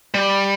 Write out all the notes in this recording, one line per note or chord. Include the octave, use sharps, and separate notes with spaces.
G3